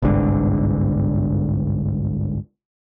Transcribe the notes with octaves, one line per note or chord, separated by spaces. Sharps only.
G1 C2 G#2 D3